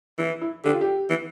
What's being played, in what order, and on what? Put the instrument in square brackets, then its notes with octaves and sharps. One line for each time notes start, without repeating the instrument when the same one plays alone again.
[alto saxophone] E3 [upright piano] E4
[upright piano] E4
[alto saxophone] D3 [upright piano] G4
[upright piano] F4
G4
[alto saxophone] E3